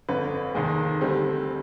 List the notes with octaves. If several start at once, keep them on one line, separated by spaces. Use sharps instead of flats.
G1 F2 D3 B4
F1 D#2 D#3 G#3
D2 D3 G3 C4